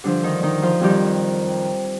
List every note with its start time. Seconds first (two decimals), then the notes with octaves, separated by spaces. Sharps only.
0.04 G2 D3 F3 D4
0.23 D#3 D#4
0.43 D#3 D#4
0.62 F3 F4
0.81 F2 D#3 G3 G4